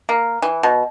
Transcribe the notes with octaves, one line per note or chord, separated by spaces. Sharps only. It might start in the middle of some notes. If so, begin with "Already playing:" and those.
A#3
E3
B2